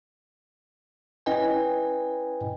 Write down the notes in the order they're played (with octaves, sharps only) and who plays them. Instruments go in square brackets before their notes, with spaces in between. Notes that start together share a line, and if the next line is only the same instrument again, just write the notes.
[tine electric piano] C#4 E4 B4 D#5 G5 G#5